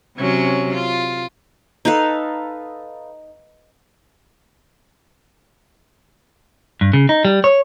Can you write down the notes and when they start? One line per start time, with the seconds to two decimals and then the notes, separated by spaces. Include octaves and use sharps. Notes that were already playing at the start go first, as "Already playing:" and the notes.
0.17 C3 F#3 C#4
0.74 F4
1.85 D#4 A4 B4 F5
6.81 G2
6.93 C#3
7.09 D#4
7.25 G3
7.44 C#5